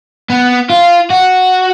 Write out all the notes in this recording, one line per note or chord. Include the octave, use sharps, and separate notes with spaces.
B3
F4
F#4